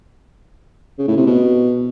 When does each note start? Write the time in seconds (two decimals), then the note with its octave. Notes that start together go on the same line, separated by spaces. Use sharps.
0.99 C#3
1.08 A2
1.17 C3
1.27 B2